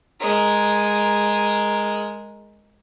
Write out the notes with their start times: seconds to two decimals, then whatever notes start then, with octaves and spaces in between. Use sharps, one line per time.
0.21 G#3 A#4